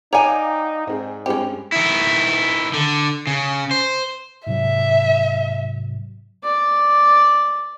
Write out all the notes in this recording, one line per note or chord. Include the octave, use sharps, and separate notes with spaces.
D#4 C#5 D5 F5 G5 G#5 A#5 D6
G#2 C4 D#4 G#4
G2 G#3 C4 C#4 G4
D#3 E4
D3
C#3
C5
G#2 C3 F#3 E5
D5